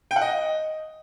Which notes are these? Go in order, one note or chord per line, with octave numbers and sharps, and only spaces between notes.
G5
F#5
D#5